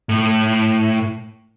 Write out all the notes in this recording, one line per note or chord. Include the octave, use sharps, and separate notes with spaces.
A2